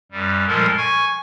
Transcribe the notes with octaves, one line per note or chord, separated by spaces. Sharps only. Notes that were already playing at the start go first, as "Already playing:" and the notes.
F#2 G3
A#2 F3 G3 G#3 A4 A#4
G#5 C#6 G#6